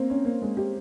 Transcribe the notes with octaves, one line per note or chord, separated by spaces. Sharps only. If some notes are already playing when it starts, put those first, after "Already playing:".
Already playing: A#3 C4
C#4
A#3
G#3
G4